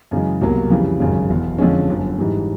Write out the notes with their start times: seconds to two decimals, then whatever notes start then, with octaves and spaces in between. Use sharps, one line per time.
0.11 F#2 C#3 E3 G#3
0.41 C2 B2 F#3 A#3
0.70 F2 C#3 E3 G3
1.00 G#1 F#2 C#3
1.29 F#1 E2 B2
1.58 F2 D3 F3 G#3 C#4
1.89 G1 F#2 D3
2.18 G#2 E3 G3